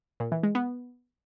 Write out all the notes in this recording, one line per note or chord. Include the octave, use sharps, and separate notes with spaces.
A#2
E3
G#3
B3